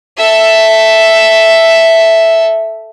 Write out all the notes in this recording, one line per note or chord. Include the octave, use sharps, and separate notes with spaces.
A4 E5